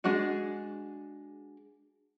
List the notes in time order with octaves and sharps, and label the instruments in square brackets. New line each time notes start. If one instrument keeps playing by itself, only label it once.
[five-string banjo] G#3 D4 F#4 G#4